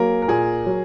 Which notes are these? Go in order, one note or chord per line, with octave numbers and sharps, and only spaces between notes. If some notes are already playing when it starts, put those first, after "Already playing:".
Already playing: F#3 A#3 G#4 A#4
A#4
A#2 G#4
F#3